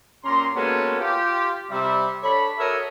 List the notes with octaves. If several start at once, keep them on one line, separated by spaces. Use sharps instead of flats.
A#2 C#4 G4 A#5 C6
G#3 A#3 B3 C#4 F#4 A4
F4 G4
C3 G3 E5
D4 A4 C#5 B5
F#4 A4 A#4 C#5 D#5 E5